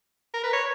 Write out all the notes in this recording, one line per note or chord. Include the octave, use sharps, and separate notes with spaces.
A#4
B4
C#5